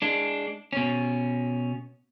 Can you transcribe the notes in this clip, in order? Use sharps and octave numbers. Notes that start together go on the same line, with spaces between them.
G#3 D4
B2 C#4